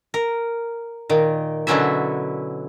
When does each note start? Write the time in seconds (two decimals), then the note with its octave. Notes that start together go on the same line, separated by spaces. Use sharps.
0.14 A#4
1.09 A#2 D#3
1.67 B2 D3 F#3 C#4 E4 E5